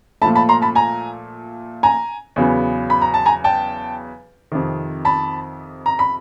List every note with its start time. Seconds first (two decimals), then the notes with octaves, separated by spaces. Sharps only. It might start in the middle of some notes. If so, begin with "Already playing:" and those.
0.21 A#2 F3 A3 A5 B5
0.35 A5 B5
0.49 A#5 C6
0.62 A5 B5
0.75 G#5 A#5
1.83 G#5 A#5
2.36 E2 C#3 F#3 B3
2.90 B5
3.02 A#5
3.14 A5
3.26 G#5 A#5
3.44 G5 A5
4.52 F2 C3 D#3
5.05 A5 B5
5.86 A#5
5.99 B5